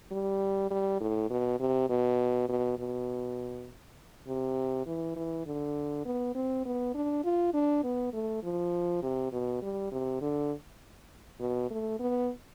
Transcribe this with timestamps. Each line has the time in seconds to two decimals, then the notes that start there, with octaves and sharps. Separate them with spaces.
0.11 G3
0.70 G3
1.00 A2
1.30 B2
1.59 C3
1.89 B2
2.49 B2
2.78 B2
4.27 C3
4.86 E3
5.16 E3
5.46 D3
6.05 B3
6.35 C4
6.65 B3
6.94 D4
7.24 F4
7.54 D4
7.83 B3
8.13 A3
8.43 F3
9.02 C3
9.32 B2
9.61 G3
9.91 C3
10.21 D3
11.40 B2
11.70 A3
11.99 B3